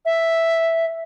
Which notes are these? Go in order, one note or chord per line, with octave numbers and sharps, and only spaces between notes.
E5